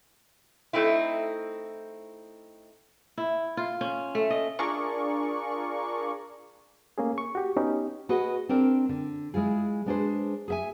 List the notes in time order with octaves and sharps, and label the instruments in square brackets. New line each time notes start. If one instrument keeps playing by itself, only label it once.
[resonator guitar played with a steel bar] A3 C4 D#4 E4
[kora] E4
F4
C#4
A3
D#5
[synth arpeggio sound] D4 F4 G#4 A#4 D5 C#6
[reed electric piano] A3 A#3 C#4 G#4
C#6
F#4 G4
B3 C#4 D#4 G4
[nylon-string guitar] F#4 G#4 B4 D#5 F#5
C4 D4 A#4 D5 G5
D3
G#3 E4 F4 G#4
G#3 B3 D4 G#4 B4 C5
G#4 E5 G#5